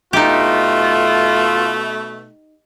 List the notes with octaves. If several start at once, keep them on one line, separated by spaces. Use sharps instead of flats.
B2 A3 D#4 F4 G4